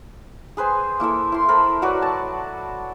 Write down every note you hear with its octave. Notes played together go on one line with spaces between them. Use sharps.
G#4 B4 C5 G#5
A#3 E4 A4 E5
E4 C6
A4 A#4 C5 B5
F#3 F#4 B4 D5
A5